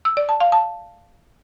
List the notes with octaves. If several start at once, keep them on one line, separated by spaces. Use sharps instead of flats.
E6
D5
A5
F5
A5